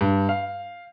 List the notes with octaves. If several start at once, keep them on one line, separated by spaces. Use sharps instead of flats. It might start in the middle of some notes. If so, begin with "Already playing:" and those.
G2
F5